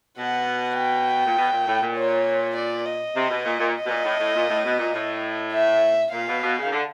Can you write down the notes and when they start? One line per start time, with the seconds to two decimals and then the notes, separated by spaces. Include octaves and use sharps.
0.18 B2 F#5
0.77 G5
1.25 A#2
1.37 B2
1.52 A#2
1.67 A2
1.81 A#2
1.96 C#5
2.56 D5
2.86 D#5
3.15 C3
3.30 B2
3.45 A#2
3.59 A#2
3.75 D#5
3.85 B2
3.89 A#2
4.04 A2
4.19 A2
4.34 A#2
4.49 A2
4.64 B2
4.78 A#2
4.94 A2
5.53 E5
6.12 A#2 F5
6.28 B2
6.43 B2
6.57 C#3
6.66 D#3
6.72 D3